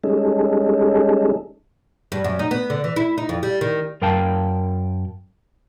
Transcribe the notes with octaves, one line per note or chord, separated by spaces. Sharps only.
G3 G#3 C#4 D#4 G#4 A4
G2
F#2
D#4
B3
D3
E3
E4
D#4
F2
G3
D#3
F#2 A#4 F5 G5 A5